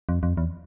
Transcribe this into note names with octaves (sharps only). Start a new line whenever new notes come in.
F2
F2
E2